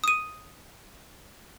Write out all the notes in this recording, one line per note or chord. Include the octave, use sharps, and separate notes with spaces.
D#6 D#7